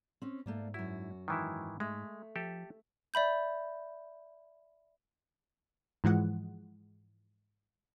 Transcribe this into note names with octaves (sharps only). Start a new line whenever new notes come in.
C4 C#4
G#2 A3 A#3 D5
F#2 E4 F#4
G#2 D#3 E3 E4
G#3 A3
F3 G4 A4 E5
D5 E5 B5 G6
G#2 E3 F3 G#3 F#5